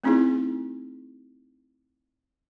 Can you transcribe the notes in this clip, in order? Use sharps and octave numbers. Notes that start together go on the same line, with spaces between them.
A3 C4 C#4 D#4 E4 G#4